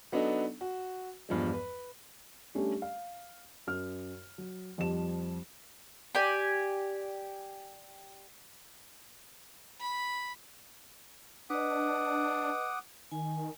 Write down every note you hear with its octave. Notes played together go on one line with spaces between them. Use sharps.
F#3 B3 D4 D#4 A4
F#4
E2 G2 F3 G#3
B4
G3 A3 C#4 D4 G4
F5
F#2 F6
F#3
F2 F3 G3 E7
G4 D5 G#5
B5
D4 B4 D#5 F#5 D6 D#6
D#3 G#5